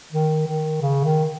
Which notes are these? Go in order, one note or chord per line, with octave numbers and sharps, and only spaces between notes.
D#3
D#3
C#3
D#3